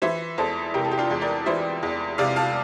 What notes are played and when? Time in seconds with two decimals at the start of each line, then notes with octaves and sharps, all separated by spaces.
0.02 E3 C5 E5
0.38 E2 A4 C5
0.74 C3 G4 A#4
0.84 A4
0.91 G4
0.98 D4 F4
1.10 E2
1.22 A#4 D5
1.46 E3 C5 E5
1.83 E2
2.18 C3 D5 F5
2.36 F5 A5